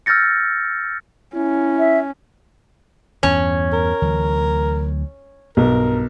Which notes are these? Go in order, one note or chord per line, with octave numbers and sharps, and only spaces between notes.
E6 F6 G6 A6 A#6 C#7
C#4 E4
E5
E2 G2 E3 C#4
A#4
D2 E3 F#3
B1 G2 A#4